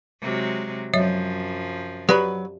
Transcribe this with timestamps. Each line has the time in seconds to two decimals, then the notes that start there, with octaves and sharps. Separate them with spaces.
0.22 C3 F#3 G#3
0.94 F#2 F3 F#3 C#5 E5
2.09 F#3 G4 B4 D5 B5